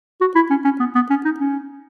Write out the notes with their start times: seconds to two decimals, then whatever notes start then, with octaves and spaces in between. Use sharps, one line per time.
0.21 F#4
0.35 E4
0.50 C#4
0.65 C#4
0.80 B3
0.95 B3
1.10 C#4
1.25 D#4
1.40 C#4